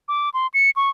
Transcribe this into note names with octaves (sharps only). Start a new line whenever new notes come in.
D6
C6
C#7
C#6